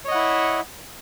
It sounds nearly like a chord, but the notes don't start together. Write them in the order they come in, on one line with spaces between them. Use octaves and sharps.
C#5 D#5 F#5 E4 E5